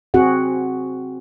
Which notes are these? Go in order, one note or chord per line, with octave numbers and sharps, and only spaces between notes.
C4 F#4 G#4 F#5